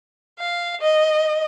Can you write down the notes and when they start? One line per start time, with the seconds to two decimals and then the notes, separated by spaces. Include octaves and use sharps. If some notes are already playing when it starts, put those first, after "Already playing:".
0.39 F5
0.81 D#5